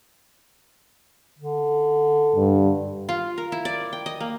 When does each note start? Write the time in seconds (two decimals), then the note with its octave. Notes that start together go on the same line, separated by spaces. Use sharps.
1.39 D3
2.36 G2
3.09 F4
3.38 A#4
3.52 E4
3.65 D5
3.93 G5
4.06 D#5
4.20 A#3